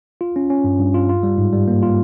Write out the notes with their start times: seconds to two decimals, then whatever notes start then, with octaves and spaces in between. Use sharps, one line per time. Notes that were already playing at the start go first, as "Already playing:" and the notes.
0.21 F4
0.36 C#4
0.50 C#4
0.64 G2
0.79 G2
0.94 F4
1.09 F4
1.23 G3
1.38 G#2
1.53 G3
1.68 A#3
1.83 F4